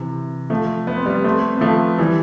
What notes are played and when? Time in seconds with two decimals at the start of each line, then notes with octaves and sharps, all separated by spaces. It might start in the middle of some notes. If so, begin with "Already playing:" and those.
Already playing: C3 E3
0.50 F3 A3
0.87 B3
0.96 C4
1.06 G3 B3
1.24 A3 C4
1.57 B3
1.61 F3 A3
1.98 E3 G3